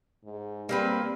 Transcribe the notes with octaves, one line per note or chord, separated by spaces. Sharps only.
G#2
G3 A#3 C4 B4